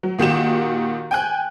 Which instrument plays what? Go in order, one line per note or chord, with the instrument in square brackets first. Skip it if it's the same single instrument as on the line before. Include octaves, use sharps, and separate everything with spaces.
[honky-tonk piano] F#3
A#2 D#3 F#4 G4 E7
G5 G#5 F#6